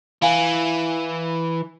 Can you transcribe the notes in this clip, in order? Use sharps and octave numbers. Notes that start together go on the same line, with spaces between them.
E3 F5 G#5